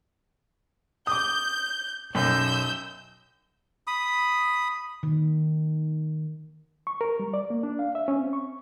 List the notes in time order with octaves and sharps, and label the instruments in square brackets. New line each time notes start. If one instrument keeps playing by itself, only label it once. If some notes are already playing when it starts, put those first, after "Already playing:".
[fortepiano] D6 D#6 [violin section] G6
[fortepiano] B1 F#2 [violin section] E6 G6
[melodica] B5 D#6
[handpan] D#3
[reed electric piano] C#6
A#4
G3
D5
A#3
D4
F5
E5
C#4
C4
C#6